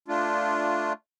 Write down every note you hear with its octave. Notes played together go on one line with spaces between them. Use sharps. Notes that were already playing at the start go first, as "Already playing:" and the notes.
A3 D4 F4